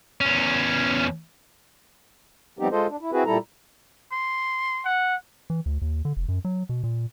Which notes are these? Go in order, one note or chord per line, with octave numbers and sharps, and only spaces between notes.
E2 C#4
F3 G3 B3 C4 D#4 G4
G#3 F4 A4 C5 D#5
D4
E4
C4 E4 F#4 G#4 B4
A#2 G3 E4 A4 A#5
C6
F#5
E3
D2
D#2
D3
F1
F#2
F#3
B2
A#2